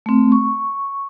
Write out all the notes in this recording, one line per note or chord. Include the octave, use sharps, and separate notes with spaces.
A3 C4
C#6